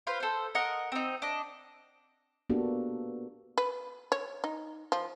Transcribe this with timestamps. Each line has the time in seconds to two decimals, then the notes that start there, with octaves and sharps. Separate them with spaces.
0.07 F4 B4 C5 F5
0.20 A4 C5
0.55 A#4 D#5 F#5
0.92 C4 D#4
1.22 D4 D#5
2.49 A#3 B3 D4 F#4 G4 A4
3.58 B4
4.12 C#5
4.44 D#4
4.92 F3